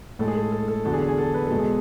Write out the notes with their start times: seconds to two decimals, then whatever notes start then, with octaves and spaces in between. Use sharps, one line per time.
0.19 A2 G#3 A4
0.28 G#4
0.35 A4
0.52 A4
0.68 A4
0.85 E2 D3 F#3 A4
0.93 G#4
1.09 G#4
1.18 A4
1.34 B4
1.47 E2 B2 G#3 A4
1.59 G#4